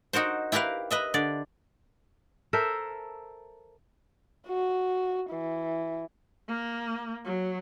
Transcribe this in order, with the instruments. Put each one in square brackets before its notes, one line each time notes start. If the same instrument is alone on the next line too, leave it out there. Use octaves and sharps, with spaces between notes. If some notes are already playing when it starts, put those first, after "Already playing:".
[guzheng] D#4 F#4 A#4 C5
E4 G4 A#4 B4 F5
B4 D#5 E5
D3 D5
[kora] A4 A#4 C5 E5
[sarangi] F#4
E3
[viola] A#3
F#3